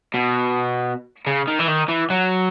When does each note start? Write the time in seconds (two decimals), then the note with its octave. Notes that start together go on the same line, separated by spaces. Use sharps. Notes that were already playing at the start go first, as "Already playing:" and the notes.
0.14 B2
1.27 C#3
1.48 D#3
1.60 E3
1.68 D#3
1.89 E3
2.10 F#3